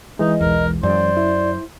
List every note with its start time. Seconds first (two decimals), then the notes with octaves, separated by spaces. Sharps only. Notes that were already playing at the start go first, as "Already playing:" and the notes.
0.19 E3 G#3 D#4 D#5
0.41 B1 E2 A#4
0.83 F#2 C5 D5
1.17 E4